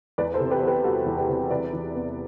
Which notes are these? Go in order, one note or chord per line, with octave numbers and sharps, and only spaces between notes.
E2 B4 D5
A4 C5
C3
G4 B4
B3
G4 B4
G3 F#4 A4
E2
G4 B4
C3
C3 B4 D5
E3
B3